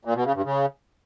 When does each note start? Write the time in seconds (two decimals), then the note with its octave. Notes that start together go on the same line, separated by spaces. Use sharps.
0.05 A#2
0.15 B2
0.25 C#3
0.35 G2
0.45 C#3